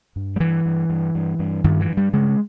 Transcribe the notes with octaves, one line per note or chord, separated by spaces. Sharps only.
G2
G3
G2 E3
G2
G2
G2
G2
G2 D#3
E3
G2
G3
C#3 G#3